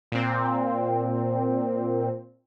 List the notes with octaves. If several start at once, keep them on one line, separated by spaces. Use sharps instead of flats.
A#2 C4